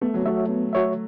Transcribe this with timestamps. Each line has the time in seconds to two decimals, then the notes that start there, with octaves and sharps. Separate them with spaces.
0.01 A3 B3
0.14 F#3
0.26 A3 F#4 C#5 E5
0.49 B3
0.73 F#4 C#5 E5